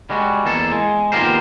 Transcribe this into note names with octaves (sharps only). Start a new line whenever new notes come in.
G3 G#3 F#4
E2 A#3 A4
G#3
D#2 B3 F4 G4 A#4 C5